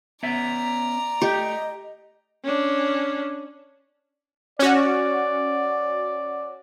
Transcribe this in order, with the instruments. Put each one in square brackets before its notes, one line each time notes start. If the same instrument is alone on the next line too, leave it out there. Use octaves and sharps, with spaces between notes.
[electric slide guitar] B3 C#4 E5 [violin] D5 A#5
[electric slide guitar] A3 [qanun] G4 [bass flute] D#5
[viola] C#4 D4
[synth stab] C#4 F#4 [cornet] D5